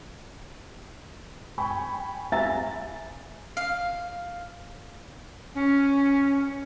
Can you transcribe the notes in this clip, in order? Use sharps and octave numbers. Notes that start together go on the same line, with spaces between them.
G5 G#5 B5 C#6
E5 F5 G#5 A#5 A6
F5
C#4